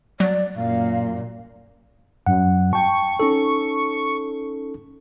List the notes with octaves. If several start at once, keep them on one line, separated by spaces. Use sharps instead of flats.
F#3 D5
F#2 A#2 F5
F#2 F#5
G5 A5 C#6
C#4 D#4 A4